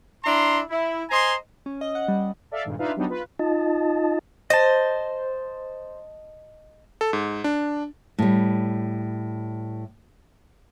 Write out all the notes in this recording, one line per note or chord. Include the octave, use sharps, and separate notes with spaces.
D4 E4 A#5 C6
E4
C5 D#5 G#5 A#5 C6
C#4
D#5
F#5
G3
A4 D5 E5 F5
G#1 G2 A#2
D4 D#4 F4 B4 E5 F5
F#3 G3 B3 D4 D#4
F4 B4
D#4 F4 D#5 A5
C5 D#5 A5
A4
G#2
D4
A2 G3